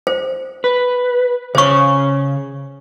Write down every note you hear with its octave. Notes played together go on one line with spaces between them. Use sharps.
C5
B4
C#3 C5 C#5 C#6